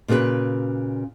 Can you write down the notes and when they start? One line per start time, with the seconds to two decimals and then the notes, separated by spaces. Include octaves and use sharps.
0.08 A#2 C#3 F#4 A#4 B4